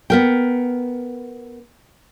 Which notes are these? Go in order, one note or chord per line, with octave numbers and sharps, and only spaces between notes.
B3 A#4 G5